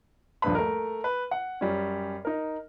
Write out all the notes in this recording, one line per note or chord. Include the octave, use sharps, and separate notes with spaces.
D#1 G2 F3 B4 B5
A3 A#4
B4
F#5
F#2 G3 C#4
D#4 A#4